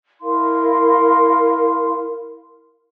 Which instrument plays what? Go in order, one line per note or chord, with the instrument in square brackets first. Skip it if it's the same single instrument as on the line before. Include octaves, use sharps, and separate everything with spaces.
[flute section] E4 A#4 F5 C6